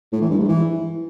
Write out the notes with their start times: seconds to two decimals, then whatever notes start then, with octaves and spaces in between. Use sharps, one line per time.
0.12 A2
0.21 E3
0.30 G2
0.39 G#2
0.48 E3